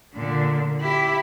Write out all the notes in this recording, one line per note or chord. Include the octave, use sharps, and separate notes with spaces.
A#2 D3
E4 G4